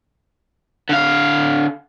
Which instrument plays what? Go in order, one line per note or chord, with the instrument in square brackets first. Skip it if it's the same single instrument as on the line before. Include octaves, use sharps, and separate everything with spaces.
[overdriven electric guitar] D3 F5